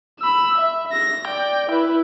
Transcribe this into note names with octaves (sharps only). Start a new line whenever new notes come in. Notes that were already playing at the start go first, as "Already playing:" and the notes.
B5 E6
E5
A#6
D5 G5
E4 B4